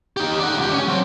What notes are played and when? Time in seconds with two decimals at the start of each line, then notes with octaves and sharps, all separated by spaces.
0.17 D#4 G4
0.40 D5 F#5
0.57 C#2 G4
0.71 C#4
0.87 F#3 C4